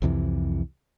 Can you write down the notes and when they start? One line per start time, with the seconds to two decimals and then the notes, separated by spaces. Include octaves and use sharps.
0.02 C2 F2 C3 E3